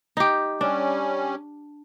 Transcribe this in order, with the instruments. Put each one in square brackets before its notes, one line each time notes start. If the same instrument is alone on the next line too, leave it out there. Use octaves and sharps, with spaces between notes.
[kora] D#4 G4
[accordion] G3 C#4 [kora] D4